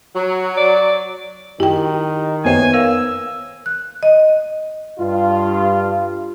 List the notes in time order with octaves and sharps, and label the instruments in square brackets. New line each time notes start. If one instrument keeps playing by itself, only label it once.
[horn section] F#3
[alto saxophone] D5
[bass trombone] D#3 [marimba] E4 G5 [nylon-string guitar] G4
[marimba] F2 C5 E5 [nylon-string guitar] B3 C#5 G5 [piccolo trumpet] G#5
[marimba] A#4 F5 [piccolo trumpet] E6
[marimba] F#6
D#5
[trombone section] G2 F4